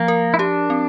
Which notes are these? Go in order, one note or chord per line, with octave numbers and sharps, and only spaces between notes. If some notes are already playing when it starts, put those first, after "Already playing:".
Already playing: F3 A#3
A#4
E4
D4 G4
C4